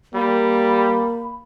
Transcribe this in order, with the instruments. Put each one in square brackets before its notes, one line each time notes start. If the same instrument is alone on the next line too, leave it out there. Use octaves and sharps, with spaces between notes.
[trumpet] G3 [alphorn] A#3 [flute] B5